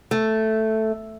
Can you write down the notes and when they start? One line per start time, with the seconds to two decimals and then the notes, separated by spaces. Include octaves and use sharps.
0.11 A3